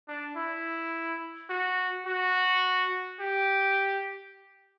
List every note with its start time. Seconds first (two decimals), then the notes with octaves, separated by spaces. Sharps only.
0.08 D4
0.37 E4
1.50 F#4
2.06 F#4
3.20 G4